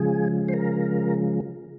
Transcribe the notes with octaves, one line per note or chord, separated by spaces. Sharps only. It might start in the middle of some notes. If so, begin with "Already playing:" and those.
Already playing: C#3 F3 G#3 G#4
C5
A#4